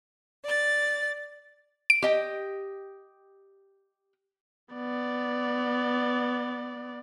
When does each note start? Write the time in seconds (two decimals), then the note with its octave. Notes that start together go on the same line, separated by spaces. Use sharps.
0.44 D5 A6
1.90 D7
2.02 G4 D#5 G5
4.74 B3 D5